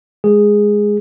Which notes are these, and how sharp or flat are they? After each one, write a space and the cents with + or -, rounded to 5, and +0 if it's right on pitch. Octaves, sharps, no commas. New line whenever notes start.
G#3 +0 G#4 -5